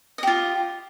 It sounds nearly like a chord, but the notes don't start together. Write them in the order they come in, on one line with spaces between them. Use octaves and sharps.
D#5 G4 F4